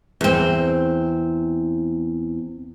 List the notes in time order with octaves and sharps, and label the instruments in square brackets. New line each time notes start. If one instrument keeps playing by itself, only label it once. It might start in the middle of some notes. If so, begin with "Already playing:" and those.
[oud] E2 C4